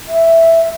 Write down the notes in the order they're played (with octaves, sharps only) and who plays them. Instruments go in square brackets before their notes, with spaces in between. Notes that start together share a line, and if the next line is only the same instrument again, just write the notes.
[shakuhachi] E5